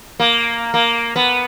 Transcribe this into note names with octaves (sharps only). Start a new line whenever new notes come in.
A#3
A#3
B3